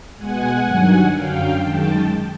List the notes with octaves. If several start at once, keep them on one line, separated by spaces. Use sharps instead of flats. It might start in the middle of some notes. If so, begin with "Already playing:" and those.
B2 G#3 F#5 G#5
G2 D#3 F#3
F#2 D3 F#3 F5 G5
F#2 D#3 G#3 G5 A5